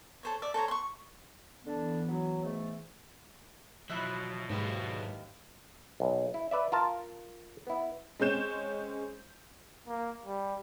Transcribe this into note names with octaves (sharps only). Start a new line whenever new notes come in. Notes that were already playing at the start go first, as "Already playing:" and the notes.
A4 C5 C#5
D5 E5
A4 C5 C#5 A#5
C6 C#6
D3 E3 B3 D4
F#3
G#2 A3
B2 F3 F#3 E4 E5 B5 F#6
D#2 G#2 F#3 G#3 B4
B1
E4
B4 D5 E5
F4 A#4 A5
B3 E4
G#3 C4 C#4 G6 E7
A#3
G3